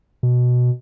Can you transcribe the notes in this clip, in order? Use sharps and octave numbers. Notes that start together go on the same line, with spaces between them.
B2